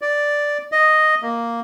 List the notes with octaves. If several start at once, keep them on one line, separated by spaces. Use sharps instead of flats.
D5
D#5
A#3